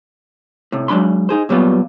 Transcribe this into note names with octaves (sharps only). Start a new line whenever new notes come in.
A2 C3
F#3 G#3 D4 B5 C6
D#4 G#4 C5
A#2 F#3 G3 B3 F4